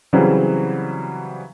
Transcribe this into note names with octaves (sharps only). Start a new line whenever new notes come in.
C#3 E3 F#3 G3 C4